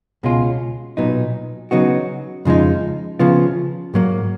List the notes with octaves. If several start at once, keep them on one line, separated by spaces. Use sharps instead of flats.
C#2 B2 G#3 C#4 F4
B1 A#2 F#3 B3 D#4
C#3 F#3 B3 D#4 F#4
F2 C#3 F3 G#3 D#4
C#3 F3 B3 F4
G#2 F#3 A#3